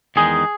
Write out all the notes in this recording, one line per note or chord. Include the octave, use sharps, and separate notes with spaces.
E2 D#3 G#3 D#4 G#4